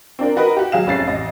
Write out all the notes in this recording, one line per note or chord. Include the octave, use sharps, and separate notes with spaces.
C4 D4 A#4
D#4 F#4 A#4 B4 D#5
F#4 G4
F#3 G#4 F5 E7
F1 C#4 A6 C7
A1 D#5